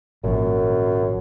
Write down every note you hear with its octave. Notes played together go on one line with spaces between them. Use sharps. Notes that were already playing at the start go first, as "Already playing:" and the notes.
G#1 F#2 A#2 F3